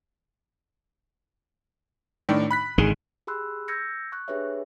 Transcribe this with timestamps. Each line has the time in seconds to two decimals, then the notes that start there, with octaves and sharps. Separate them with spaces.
2.29 A2 D#3 D4
2.50 B5 F#6 B6
2.78 G#1 D3 D#3 G#4
3.27 G4 G#4 B5 C6 E6 F#6
3.68 E6 G6 G#6 A#6 C#7
4.12 C#6 F#6
4.28 D4 G4 G#4 B4 C#5 E5